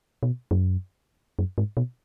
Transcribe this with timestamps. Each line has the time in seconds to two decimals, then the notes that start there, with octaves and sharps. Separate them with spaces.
0.23 B2
0.51 F#2
1.39 F#2
1.58 G#2
1.77 B2